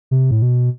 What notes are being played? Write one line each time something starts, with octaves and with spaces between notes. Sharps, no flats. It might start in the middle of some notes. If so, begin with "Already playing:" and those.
C3
A2
B2